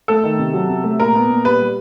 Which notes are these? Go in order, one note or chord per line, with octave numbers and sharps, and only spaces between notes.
A3 A4
D#3
C3
F#3
C3
A3
A#2 A#4
B3
A#2
G3 B4
G3